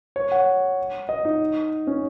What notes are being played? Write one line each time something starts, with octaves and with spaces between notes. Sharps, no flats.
C#5
F#5
D#5
D#4
C#4